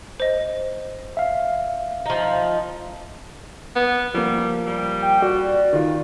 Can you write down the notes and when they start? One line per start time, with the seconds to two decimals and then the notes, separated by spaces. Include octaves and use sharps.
0.20 C5 D#5
1.17 E5 F5
2.06 F3 D#4
3.76 B3
4.14 F3 G3 A#3
4.67 G3
5.02 G5
5.22 F#4 D5
5.73 D#3 F4